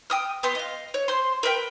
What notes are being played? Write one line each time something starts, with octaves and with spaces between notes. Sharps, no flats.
G5 D#6 F6
B3 G4 C6
D#5 F5
C#5
C5 C6
A#4 B4 F5 G5